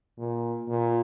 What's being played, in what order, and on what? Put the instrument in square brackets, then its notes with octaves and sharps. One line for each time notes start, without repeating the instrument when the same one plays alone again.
[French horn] A#2
A#2